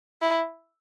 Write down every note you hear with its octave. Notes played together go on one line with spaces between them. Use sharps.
E4